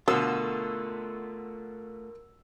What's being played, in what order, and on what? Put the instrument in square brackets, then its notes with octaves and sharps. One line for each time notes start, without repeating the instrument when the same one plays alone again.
[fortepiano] B2 D3 [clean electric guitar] A3 F4 [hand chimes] A#4 [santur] E6